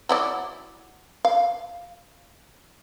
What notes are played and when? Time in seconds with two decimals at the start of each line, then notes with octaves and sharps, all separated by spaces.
0.09 F#3 E4 D5
1.25 F5